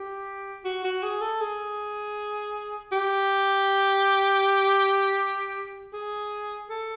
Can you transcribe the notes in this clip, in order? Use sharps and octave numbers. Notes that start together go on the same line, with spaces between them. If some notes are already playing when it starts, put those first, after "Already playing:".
Already playing: G4
F#4
F#4
G#4
A4
G#4
G4
G#4
A4